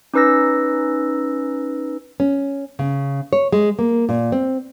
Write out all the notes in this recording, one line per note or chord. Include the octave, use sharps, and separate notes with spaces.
C#4 D#4 B4 E6 A#6
C#4
C#3
C#5
G#3
A#3
A#2
C4